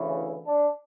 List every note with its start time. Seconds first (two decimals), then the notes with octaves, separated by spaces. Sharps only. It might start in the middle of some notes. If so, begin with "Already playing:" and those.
Already playing: D2 C#3 E3
0.16 E4
0.46 D4